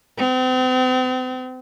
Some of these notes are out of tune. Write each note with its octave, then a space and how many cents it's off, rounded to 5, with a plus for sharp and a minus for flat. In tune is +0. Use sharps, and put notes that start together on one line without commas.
C4 -40